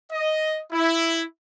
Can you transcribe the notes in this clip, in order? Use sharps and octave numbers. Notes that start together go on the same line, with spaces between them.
D#5
E4